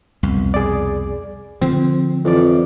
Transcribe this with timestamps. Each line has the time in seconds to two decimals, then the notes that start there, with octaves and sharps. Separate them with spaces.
0.23 C2 F2 B2
0.54 G#4 D5
1.61 D3 F3 C4
2.25 F2 E3 D5